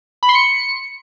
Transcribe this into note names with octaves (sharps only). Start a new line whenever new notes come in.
B5
C6
C#7